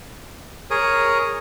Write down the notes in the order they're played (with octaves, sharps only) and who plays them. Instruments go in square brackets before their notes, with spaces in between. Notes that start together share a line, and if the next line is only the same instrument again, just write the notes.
[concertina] G#4 A#4 C#5 D#6